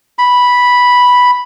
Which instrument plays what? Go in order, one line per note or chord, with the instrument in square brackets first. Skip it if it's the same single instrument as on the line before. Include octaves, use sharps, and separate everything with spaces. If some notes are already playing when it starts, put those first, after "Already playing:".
[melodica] B5